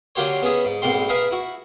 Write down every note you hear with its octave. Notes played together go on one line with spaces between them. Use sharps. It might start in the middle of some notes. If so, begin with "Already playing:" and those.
D3 F#3 A#3 G4 C5 C#5
B3 C#4 G#4 E5
G#2
B1 G#2 B2 A#3 C4 C6
G#4 A#4 B4 E5 F5
E4 F#4